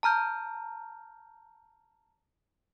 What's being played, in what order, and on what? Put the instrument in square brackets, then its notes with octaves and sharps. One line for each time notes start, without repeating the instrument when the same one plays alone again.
[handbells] A5 A#5 F6 G6